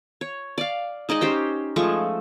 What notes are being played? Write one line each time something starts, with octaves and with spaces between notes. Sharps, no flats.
C#5
D5 F5
G#3 D#4 D5 D#5
C#4 G4 C5 G5
F3 G#3 A3 C#6